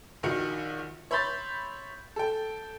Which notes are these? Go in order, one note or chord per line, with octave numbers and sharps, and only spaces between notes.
A#1 D#3 F#4 C#7
C#5 E5 B5 C6 G6 A6
A4 G5